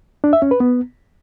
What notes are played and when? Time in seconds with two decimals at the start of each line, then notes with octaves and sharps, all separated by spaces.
0.24 D4
0.33 E5
0.42 C#4
0.51 B4
0.60 B3